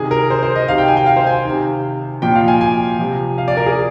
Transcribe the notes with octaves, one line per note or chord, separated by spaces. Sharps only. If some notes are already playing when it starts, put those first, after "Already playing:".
Already playing: C3 D#3 G#4
A#4
C5
C5
D#5
C3 D#3 F5
G5
G#5
G5
F5
C5
G#5
C3 D#3
A#2 F3 G5
F5
G#5
G#5
C3 F3
F5
D5
A#4
G#4